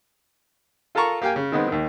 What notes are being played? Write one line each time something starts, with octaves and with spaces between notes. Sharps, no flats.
F4 A4 A#4 A5 A#5 C#6
A#3 G4 F5 G5 G#5
C#3
D#3 G#3 B3 C4
D#2 D#3